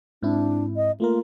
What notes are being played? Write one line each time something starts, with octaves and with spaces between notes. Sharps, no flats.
G#2 C4 D4 E4
D#5
A3 A#3 F4 A#4